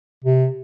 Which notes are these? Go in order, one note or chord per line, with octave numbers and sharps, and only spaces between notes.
C3